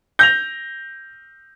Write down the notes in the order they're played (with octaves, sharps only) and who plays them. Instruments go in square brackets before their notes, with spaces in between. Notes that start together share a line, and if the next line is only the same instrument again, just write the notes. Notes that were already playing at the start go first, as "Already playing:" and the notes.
[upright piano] G6 A#6 F7